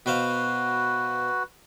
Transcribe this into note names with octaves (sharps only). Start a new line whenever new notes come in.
B2 F#4 B4 C5 F5